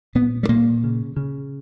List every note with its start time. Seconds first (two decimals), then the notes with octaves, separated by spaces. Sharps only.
0.15 A#2 B3
0.43 G3
0.49 A#2 A#3
0.84 C#3
1.17 C#3